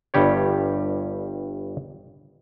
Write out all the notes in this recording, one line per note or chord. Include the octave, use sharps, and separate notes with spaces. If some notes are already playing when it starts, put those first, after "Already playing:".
G1 G2 G3 G4 C#5